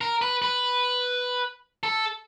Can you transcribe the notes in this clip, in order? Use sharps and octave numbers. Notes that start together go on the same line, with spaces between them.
A#4
B4
B4
A4